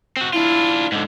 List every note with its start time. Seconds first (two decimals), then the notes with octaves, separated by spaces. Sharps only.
0.17 C4 F#4
0.33 D4 E4 F4
0.92 G#2 D3